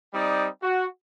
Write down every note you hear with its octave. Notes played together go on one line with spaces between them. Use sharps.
G3 C4 D#4 D5 G5 D#6
F#4